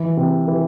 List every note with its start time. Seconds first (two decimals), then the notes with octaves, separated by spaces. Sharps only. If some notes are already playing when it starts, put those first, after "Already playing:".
Already playing: E3
0.17 C3
0.47 E3